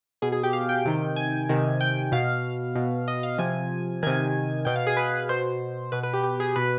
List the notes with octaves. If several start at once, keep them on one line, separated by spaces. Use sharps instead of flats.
B2 G#4
G#4
G4
F5
G5
C3 D#3
G#5
C3 D#3
G5
B2 F5
B2
D#5
F5
C3 F3 G#5
C3 D#3 G#5
B2 G5
F5
G#4
B4
B2 C5
B2 B4
B4
G4
G4
G#4
B2 B4